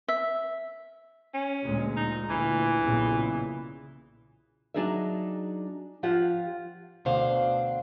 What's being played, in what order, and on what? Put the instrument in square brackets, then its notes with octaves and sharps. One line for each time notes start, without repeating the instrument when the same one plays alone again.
[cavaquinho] E5
[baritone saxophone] C#4
[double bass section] D2 A#2 G#3
[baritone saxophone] D#4
[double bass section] D2 A#2 [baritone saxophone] E3
[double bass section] B1 A#2 C#3
[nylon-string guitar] F#3 D4 D#4 G#4 D#5 E5
F3 F4 G4 F#5
[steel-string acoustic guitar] D2 B2 D4 C5 F5